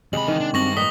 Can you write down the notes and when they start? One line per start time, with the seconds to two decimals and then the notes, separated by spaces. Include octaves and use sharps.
0.13 D#2 C3 G#3 B5 F#7
0.28 D#3 E3 D#4
0.40 D4
0.54 G2 C4 D4 F#4 C#6 A#6 F#7
0.77 E3 A#3 D#4 F#5 D#6 B6 G7